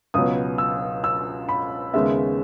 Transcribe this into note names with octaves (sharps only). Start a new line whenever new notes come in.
C#2 B2 F#3 B3 D#6
E6
E6
B5
D#2 C#3 G#3 B3 E5